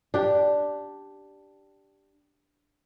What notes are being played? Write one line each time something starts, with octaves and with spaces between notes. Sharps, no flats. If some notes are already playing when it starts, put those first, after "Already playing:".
D4 G4